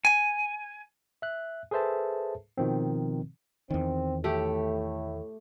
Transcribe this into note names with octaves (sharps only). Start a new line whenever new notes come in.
G#5
E5 F#6
G#4 A4 B4 C5 E5 A5
B2 D#3 F3 C4
E2 D#3 C4
A2 A3 G4